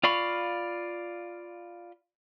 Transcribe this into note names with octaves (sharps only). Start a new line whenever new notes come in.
F4 D5 F5 B5 C#6